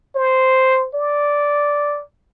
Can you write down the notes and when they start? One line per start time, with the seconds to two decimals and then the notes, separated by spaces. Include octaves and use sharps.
0.15 C5
0.94 D5